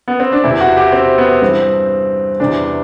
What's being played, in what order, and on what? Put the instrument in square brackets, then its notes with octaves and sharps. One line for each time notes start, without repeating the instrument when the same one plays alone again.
[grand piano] B3
C4
D4
E2 C3 E3 E4
F#4
G4
C4
B3
G2 E3 C4
E2 C3 E3 D4